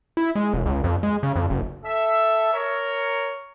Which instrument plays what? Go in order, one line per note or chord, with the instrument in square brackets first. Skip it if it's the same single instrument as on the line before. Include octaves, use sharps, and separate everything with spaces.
[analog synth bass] E4
G#3
F1
C#2
F2
G#3
C#3
F2
F#1
[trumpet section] A4 E5
A#4 C#5